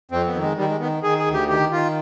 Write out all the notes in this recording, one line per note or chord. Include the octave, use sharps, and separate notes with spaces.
F2 C4
B3
D#3
G#3
D#3 G3
G#3
D#3 B3
D#3 G#4
G#4
D2
G4
D#3 G4
D#3 F4